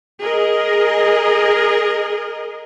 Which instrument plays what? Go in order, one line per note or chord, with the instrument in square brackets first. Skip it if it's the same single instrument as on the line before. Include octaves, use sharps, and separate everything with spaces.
[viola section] G#4 A#4 D#5